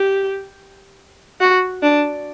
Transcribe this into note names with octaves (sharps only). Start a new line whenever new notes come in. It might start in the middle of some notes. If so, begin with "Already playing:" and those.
Already playing: G4
F#4
D4